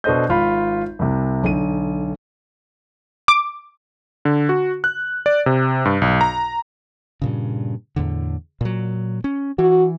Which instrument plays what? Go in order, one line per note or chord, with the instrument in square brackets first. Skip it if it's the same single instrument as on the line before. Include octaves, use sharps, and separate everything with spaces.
[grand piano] B2 D4 A4 C5 D#5 G6
G#1 F4 B5
C2 C3
B1 D3 D#7
[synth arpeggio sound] D6
[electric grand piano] D3
F#4
F#6
D5
C3
G2
B1
A#5
[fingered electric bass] G2 A#2 C#3
E2 A2 D3
A#2 F#3
C#4
[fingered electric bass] E3 [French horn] F#4